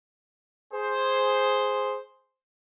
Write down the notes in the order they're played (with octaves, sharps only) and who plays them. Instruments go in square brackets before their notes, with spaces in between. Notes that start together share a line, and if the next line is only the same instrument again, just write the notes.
[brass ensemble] G#4 C5